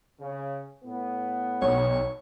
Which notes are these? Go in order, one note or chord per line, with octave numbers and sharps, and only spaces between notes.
C#3
A2 B3
B1 C#5